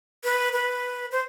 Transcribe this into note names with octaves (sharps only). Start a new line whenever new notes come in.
B4
B4
C5